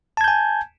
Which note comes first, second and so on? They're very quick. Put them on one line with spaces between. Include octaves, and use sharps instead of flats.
A5 G#6 G6 G#5